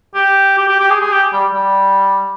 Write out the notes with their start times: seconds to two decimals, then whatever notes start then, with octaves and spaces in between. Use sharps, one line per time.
0.15 G4
0.58 G4
0.69 G4
0.80 G4
0.91 G#4
1.01 G#4
1.12 G4
1.33 G3
1.54 G3